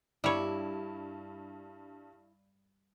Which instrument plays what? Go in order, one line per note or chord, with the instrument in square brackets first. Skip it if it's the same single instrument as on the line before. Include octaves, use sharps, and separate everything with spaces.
[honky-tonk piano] G2 [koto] G3 C#5 [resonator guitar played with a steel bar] E4